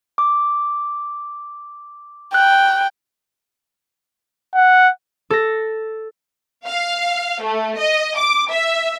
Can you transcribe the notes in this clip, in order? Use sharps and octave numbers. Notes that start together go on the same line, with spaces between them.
D6
G5 F#6
F#5
A4 A#6
F5
A3
D#5
D6
E5